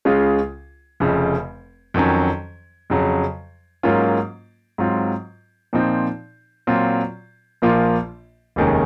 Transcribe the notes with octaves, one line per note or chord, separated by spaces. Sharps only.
C#2 C#3 G#3 C#4 F4
F1 F2 C#3
F2 D#3 F#3 C#4
F2 C#3 F#3
G#2 F#3 A#3 C#4 F4
G#2 F#3 C4 F4
A#2 F3 C4 D#4
A#2 F#3 C4 F4
A#1 A#2 F3 A#3 F4
F1 D#2 D#3 G#3 C#4